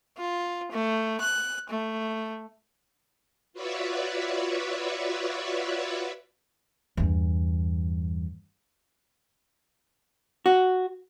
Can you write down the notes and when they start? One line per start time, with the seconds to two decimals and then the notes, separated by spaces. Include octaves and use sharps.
0.17 F4
0.71 A3
1.20 F#6
1.69 A3
3.53 F4 F#4 B4 C#5 D5 E5
6.97 E2 G2
10.46 F#4